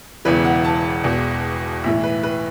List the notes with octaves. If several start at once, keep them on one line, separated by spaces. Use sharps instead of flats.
E1 E2 C#3 E3 B4
F#5
A5
E1 E2 B2
B1 A2 E3 E5
B4
B4